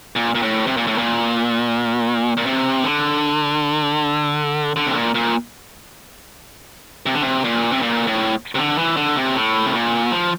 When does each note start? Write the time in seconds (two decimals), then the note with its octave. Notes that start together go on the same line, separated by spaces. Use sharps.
0.16 A#2
0.35 A#2
0.42 A2
0.67 C3
0.77 A#2
0.87 A2
0.98 A#2
2.37 A#2
2.46 C3
2.84 D3
4.76 D3
4.87 C3
4.94 A#2
5.15 A#2
7.06 C3
7.14 D3
7.22 C3
7.44 A#2
7.72 C3
7.82 A#2
8.07 A2
8.55 C3
8.58 D3
8.78 E3
8.97 D3
9.16 C3
9.35 A2
9.66 C3
9.74 A#2
10.12 F3